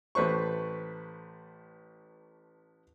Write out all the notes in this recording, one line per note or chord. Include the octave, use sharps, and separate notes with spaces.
A1 A3 B4 C5 C#6